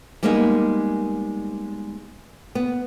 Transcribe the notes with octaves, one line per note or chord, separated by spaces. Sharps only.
G3 G#3 A#3 B3 D#4 G#4
B3